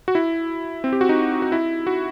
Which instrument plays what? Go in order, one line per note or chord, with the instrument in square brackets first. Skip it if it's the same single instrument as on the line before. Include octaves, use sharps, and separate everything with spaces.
[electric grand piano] F#4
E4
C4
G4
F#4
D#4
F#4
E4
F#4